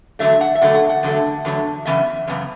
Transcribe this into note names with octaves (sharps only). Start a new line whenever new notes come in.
E2 D3 F#3 A3 E5
F#5
E5
E2 D3 F#3 A3 F#5
F#5
F#5
E2 D3 F#3 A3
E2 D3 F#3 A3
F#2 C#3 E3 B3 E5
F#2 C#3 E3 B3